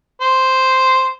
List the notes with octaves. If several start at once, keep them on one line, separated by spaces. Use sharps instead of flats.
C5